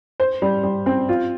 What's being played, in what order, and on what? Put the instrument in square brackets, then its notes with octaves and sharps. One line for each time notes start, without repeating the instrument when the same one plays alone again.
[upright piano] C5
G3
G3
C4
F4